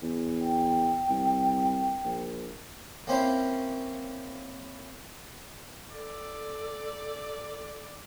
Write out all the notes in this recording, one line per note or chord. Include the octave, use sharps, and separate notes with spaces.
E2
G5
C2
A#1
A#3 C4 C#4 E4 C5 F5
A4 D5